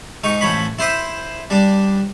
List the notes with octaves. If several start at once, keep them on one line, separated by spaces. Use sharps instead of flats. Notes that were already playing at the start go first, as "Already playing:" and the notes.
G#2 D#4 C#6
A1 F3 C#5 B5
E4 C5 E5 D#6
G3 D4